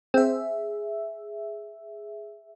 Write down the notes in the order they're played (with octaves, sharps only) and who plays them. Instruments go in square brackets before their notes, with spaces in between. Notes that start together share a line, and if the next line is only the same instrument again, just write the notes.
[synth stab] C4 [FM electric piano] G#4 E5